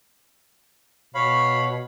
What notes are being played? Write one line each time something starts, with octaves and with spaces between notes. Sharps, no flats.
B2 C#5 F5 B5